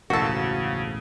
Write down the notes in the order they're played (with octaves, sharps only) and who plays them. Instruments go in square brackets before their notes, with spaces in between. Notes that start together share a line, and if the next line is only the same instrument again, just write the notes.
[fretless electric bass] E1 A1 [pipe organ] C#3 [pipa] F3 A4 [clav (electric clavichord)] F#4